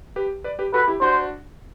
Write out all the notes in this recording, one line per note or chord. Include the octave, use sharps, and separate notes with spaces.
G4 B4
B4 D5
G4 B4
F#4 A4 B4
E4 G4
D4 F#4 C5